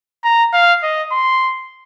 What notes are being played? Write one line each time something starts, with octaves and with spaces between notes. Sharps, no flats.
A#5
F5
D#5
C6